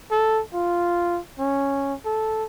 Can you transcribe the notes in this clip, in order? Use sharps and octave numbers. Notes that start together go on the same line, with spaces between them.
A4
F4
C#4
A4